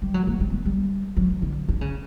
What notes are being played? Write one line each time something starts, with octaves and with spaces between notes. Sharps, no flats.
G3
F#3
A#3
G3
B3
G3
F#3
E3
D3
D3
C#3